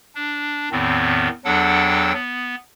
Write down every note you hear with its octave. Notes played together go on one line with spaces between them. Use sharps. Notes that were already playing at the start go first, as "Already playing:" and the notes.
D4
E2 A2 D#3 B3 C4
E2 F#3 D4 A4 F#5 G5
B3